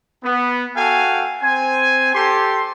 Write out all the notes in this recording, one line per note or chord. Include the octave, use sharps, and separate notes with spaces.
B3
F#4 A4 F5 G5 G#5
C4 C5 G#5
G4 A4 C6